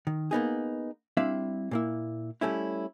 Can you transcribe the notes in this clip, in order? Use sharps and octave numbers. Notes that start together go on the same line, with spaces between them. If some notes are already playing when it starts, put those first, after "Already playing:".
D#3
A#3 B3 D#4 G#4
G3 C4 D4 E4 E5 F5
A#2 A#3 E4
G3 A3 C#4 E4